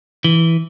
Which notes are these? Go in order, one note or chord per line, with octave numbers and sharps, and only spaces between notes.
E3